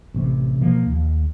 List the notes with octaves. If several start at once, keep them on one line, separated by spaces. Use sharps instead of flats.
A1 C3
B2 E3 F3 A#3
D#2